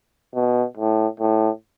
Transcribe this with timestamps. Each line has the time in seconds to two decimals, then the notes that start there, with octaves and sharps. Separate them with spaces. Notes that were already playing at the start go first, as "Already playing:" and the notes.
0.35 B2
0.77 A2
1.20 A2